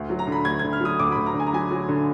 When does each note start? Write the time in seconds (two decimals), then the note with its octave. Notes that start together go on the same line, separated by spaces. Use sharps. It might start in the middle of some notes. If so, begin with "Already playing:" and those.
Already playing: D2
0.09 F#3
0.19 A#5
0.27 D3
0.32 B5
0.45 D2 G#6
0.59 D3 G#6
0.73 F6
0.81 F#3 D#6
0.99 D2 D6
1.12 D2 B5
1.26 A#5
1.34 D3
1.40 G#5
1.47 A#5
1.53 F#3 G#5
1.70 F#3
1.88 D3